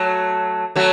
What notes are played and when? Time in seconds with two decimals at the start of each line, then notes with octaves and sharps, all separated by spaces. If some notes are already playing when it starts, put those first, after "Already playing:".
Already playing: F#3 A3
0.76 F#3 A3